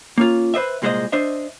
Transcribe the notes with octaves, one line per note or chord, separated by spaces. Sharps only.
A#3 C#4 F4
B4 C5 D#5 E5
C2 A#2 G#3 E4 C5 D#5
D4 C5 D#5 E5